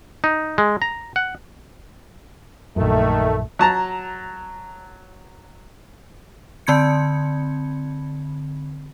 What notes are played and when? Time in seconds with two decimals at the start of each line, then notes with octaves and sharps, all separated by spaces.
0.24 D#4
0.58 G#3
0.82 A#5
1.16 F#5
2.76 A#1 F#2 D#3 A3
3.59 F#3 A5 A#5
6.67 D3 C4 B5 G#6 C#7